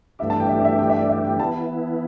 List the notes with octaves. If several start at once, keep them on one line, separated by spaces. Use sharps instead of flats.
G2 E3 A3 D4 G4 E5
A5
G5
E5
D5
E5
G5
E5
D5
E5
G5
E3 B3 E4 A5